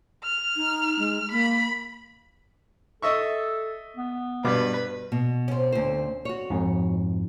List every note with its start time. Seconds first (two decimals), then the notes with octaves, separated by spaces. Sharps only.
0.23 F6
0.56 D#4
0.99 G#3
1.31 A#3 B5
3.02 A4 D#5 E5 C#6
3.97 B3
4.45 G2 B2 B4 D6
5.12 B2
5.48 C4 C#4
5.72 D2 C5
6.25 F#4 C#5
6.50 F2 G#2